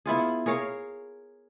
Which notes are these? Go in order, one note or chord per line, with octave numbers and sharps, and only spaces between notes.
B3 E4 F4 G#4
G#4 A#4 C#5 F5